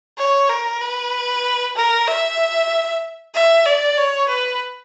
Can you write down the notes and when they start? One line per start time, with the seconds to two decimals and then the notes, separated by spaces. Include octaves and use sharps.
0.18 C#5
0.50 A#4
0.81 B4
1.76 A#4
2.07 E5
3.35 E5
3.66 D5
3.97 C#5
4.29 B4